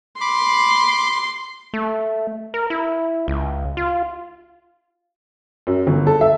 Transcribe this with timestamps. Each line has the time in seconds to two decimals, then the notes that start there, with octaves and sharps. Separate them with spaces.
0.21 B5 C6 D6
1.73 A3
2.54 A#4
2.70 E4
3.28 C#2
3.77 F4
5.67 F#2
5.87 G1
6.07 A4
6.21 E5